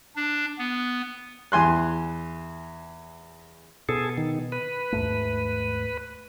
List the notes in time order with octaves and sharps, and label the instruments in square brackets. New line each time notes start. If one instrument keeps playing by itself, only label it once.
[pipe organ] D4
B3
[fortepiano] E2 G#5 C6 F#6
[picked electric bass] B2 [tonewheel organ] G#4 A4
[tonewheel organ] D#3
B4
[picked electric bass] D#2 G#2 A3